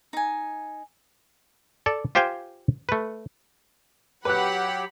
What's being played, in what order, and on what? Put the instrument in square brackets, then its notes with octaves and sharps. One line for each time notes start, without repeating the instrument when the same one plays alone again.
[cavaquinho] D#4 G#5
[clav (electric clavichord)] A4 D5 A5
F4 G4 C5 F5 G5 G#5
A3 B4
[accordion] F#3 G4 [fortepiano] B4 F#6 [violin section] F#5 B5